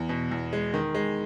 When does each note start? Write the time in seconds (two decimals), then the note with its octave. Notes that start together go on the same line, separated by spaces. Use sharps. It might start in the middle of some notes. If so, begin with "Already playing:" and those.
Already playing: E2
0.09 B2
0.31 E2
0.53 G#3
0.74 D#3
0.95 G#3